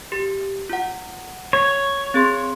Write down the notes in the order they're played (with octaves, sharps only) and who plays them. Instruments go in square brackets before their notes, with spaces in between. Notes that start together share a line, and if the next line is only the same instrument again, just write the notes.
[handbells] G4
F4 F#5
[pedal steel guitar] C#5
[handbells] C4 G#4 C6